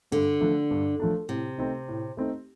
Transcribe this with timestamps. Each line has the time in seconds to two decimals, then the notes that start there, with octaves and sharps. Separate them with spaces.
0.12 G2 D3
0.41 F3 A3 D4
0.71 G2
1.00 F3 A3 D4
1.29 A2 C3
1.58 A3 C4 D#4
1.88 A2
2.17 A3 C4 D#4